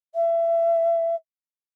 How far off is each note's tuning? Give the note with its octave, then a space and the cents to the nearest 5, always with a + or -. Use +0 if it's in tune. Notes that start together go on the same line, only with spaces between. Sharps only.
E5 +25